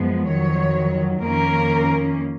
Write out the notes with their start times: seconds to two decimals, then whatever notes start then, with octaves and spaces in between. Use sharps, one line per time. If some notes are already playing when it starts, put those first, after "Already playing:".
Already playing: F#2 F3 G#3 B3
0.27 F2 D#3 F#3 C#5
1.22 F2 D#3 A#3 C#4 A#4